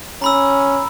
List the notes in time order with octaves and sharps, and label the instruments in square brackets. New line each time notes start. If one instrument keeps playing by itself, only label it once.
[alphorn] C#4 [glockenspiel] A#5 B5 E6